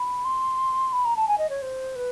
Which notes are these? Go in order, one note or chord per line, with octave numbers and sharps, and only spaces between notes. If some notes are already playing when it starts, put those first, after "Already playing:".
Already playing: B5
C6
B5
A#5
A5
G#5
D#5
C#5
C5
B4